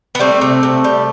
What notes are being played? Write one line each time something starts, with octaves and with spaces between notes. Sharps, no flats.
B3
G3 A3 C4
C3
C3
G3